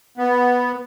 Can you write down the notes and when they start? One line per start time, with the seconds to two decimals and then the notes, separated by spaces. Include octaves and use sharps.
0.17 B3